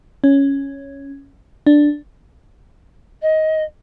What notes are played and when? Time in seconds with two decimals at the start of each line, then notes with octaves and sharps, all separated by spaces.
0.24 C#4
1.67 D4
3.22 D#5